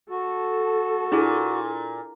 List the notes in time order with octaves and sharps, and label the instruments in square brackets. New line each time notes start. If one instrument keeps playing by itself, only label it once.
[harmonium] F#4 [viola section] A4
[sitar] A#2 [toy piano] D4 E4 G#4